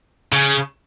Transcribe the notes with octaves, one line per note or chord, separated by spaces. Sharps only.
C#3